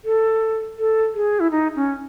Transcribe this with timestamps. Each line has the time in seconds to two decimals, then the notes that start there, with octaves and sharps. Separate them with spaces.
0.05 A4
0.78 A4
1.14 G#4
1.40 E4
1.51 D#4
1.76 C#4